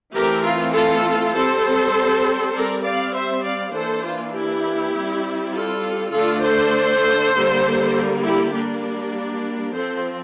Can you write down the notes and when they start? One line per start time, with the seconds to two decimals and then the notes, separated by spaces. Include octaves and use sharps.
0.14 E3 A3 C4 G4 A#4
0.44 F4
0.74 F4 A4
1.34 G3 C4 A4 C5
2.54 G3 C4 A#4 D5
2.84 D5 F5
3.14 C5 E5
3.44 D5 F5
3.74 E3 A#3 D4 A4 C5
4.04 F4
4.34 E4 G4
4.94 G3 C4
5.54 F4 A4
6.14 D3 A3 D4 F4 A4
6.44 A4 C5
7.34 D3 G3 A#3
8.23 E4 G4
8.53 G3 A#3 D4
9.74 F3 C4 A4 C5